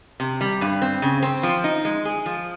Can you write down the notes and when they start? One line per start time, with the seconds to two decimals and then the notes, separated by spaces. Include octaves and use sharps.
0.20 C3
0.41 G3
0.61 G2
0.82 C4
1.02 C#3
1.23 C4
1.43 F3
1.64 D#4
1.85 G#3
2.05 G#4
2.26 F3